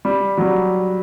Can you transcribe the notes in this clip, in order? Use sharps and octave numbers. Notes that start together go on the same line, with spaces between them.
G3
F#3
G3